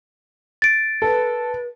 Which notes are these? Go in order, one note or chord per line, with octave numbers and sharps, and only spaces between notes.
A6 D7
A4 B4